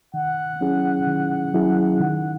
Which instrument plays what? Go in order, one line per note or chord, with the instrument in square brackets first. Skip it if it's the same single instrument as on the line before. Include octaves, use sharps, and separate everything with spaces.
[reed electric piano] D#3 [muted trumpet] F#5
[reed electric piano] F#3 C#4 E4 G#4
D#3
F#3 C#4 E4 G#4
[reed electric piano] D#3 [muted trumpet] F#5